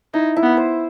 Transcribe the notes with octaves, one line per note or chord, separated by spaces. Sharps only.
D#4 E4
E4
B3
C5